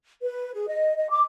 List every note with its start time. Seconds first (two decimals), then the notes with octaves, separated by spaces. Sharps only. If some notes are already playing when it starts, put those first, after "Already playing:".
0.21 B4
0.53 G#4
0.68 D#5
0.96 D#5
1.09 D6